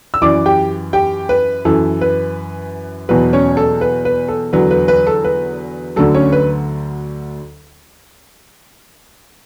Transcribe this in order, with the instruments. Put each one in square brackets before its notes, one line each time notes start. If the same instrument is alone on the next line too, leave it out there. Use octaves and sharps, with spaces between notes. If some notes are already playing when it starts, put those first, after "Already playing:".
[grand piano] E6
F#2 E3 D5 D6
G4 G5
G4 G5
B4
F#2 E3 A4
B4
E2 B2 F#3 B4
C#4 C#5
A4
B4
B4
A4
E2 D3 F#3 B4
B4
B4
A4
B4
D2 D3 F#3 A4
C#4 C#5
B4